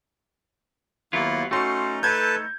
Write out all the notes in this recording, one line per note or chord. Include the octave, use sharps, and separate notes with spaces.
D#2 F#3 A#3 B3 E4 F4
A3 C#4 D#4 F#4 C6
A4 B4 A5 G6 G#6